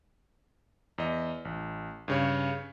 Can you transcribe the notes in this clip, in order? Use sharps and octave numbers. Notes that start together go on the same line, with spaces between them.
E2 D#5
A1
G2 C#3 C#5